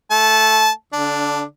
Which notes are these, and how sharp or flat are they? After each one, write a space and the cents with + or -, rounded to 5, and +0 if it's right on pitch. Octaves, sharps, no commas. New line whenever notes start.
A3 +0 A5 -20
D3 -30 D4 +0